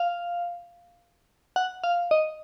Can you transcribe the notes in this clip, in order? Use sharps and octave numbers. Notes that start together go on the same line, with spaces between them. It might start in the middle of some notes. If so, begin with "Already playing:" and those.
Already playing: F5
F#5
F5
D#5